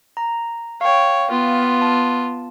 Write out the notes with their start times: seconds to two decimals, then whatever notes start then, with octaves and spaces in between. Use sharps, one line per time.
0.17 A#5
0.81 C#5 F5 G5
1.30 B3 F4
1.82 A5